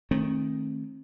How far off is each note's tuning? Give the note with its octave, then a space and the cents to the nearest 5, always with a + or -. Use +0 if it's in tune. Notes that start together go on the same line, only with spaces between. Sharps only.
D#3 +0 A3 +0 C4 +40